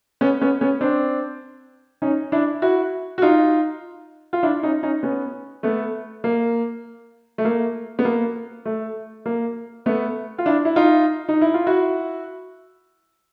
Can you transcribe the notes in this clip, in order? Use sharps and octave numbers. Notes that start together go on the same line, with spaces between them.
B3 C#4
B3 C#4
B3 C#4
C4 D4
C#4 D#4
D4 E4
E4 F#4
F#4
D#4 F4
F4
D4 E4
C#4 D#4
C#4 D#4
B3 C#4
A3 B3
A#3
A3
A#3
B3
A#3
A3
A#3
A3 B3
F4
D4 E4
E4
D#4 F4
D#4
E4
F4
E4 F#4